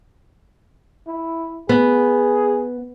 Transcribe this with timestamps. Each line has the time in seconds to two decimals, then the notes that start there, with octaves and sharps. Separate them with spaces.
1.07 E4
1.69 B3 G#4